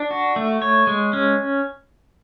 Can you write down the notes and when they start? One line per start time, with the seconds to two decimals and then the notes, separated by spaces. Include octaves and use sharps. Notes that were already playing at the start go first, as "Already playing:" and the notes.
Already playing: D4
0.11 F#4
0.36 A3
0.62 C#5
0.87 G#3
1.13 C#4